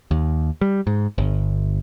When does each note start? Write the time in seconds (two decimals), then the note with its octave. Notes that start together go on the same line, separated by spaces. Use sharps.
0.11 D#2
0.61 G3
0.87 G#2
1.18 G1